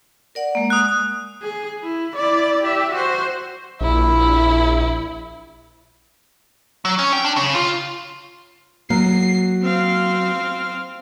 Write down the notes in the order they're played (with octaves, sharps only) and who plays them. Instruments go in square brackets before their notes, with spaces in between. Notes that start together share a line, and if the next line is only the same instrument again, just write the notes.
[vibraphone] A#4 D5 F#5
G#3 A#3
[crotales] D#6 F#6
[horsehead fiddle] G#4
E4
E4 D5
G4 E5
F#4 C5
[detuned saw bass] A#1 [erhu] E4
[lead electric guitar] F#3
C#4
G5
D4
C#3
F4
[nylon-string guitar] F#3 [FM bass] A#3 [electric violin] C7
[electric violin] C4 F5